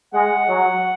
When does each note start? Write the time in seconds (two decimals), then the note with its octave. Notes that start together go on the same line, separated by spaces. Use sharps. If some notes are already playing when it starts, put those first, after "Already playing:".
0.13 G#3 F#5
0.48 F#3